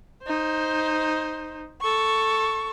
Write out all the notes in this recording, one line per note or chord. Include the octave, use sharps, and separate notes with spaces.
D#4 C5
A4 C#6